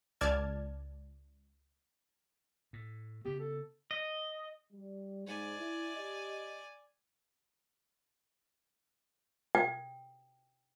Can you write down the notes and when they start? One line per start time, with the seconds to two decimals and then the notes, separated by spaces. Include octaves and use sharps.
0.21 C#2 D5 A5 F6 G#6 A6
2.73 A2
3.25 C#3 B3 G4
3.40 A4
3.91 D#5
4.72 G3
5.26 G#2 D5 G#5
5.59 E4
5.97 G4 D#5
9.55 G5